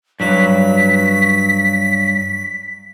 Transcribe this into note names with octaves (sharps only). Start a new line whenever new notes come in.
G2 F#3 B6